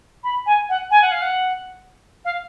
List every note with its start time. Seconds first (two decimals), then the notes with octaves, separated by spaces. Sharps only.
0.23 B5
0.46 G#5
0.69 F#5
0.91 G#5
1.02 F#5
1.11 F5
1.21 F#5
2.24 F5